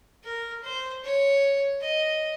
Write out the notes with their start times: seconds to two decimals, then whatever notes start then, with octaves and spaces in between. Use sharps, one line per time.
0.24 A#4
0.63 C5
1.03 C#5
1.82 D#5